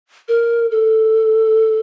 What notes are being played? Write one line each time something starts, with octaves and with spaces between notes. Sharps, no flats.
A#4
A4